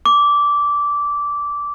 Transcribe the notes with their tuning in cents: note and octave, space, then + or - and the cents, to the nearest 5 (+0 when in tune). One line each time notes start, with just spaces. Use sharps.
D6 -15